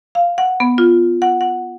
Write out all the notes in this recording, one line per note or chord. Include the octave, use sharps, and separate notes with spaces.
F5
F#5
B3
F4
F#5
F#5